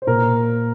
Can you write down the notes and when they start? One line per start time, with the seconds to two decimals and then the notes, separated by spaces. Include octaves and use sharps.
0.02 C5
0.07 A#2 A#4